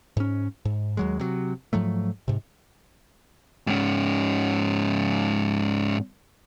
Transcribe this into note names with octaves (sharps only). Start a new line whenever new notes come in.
G#2 C#4
G#2
D#2 F#3 G#3
C3 F#3
G#2 F3 F#3 A3
G#2 C3
G#2 C#4